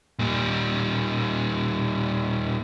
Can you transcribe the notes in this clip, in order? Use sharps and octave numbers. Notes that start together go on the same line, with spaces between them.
A#2 G3